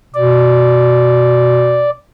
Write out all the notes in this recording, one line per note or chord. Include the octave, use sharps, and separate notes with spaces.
B2 D5